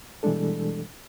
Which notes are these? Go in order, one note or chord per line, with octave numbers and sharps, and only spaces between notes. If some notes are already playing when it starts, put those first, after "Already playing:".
B2 E3 G3 G#3 D4 A4